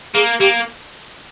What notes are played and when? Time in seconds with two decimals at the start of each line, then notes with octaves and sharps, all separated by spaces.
0.14 A#3 G#4
0.40 A#3 G4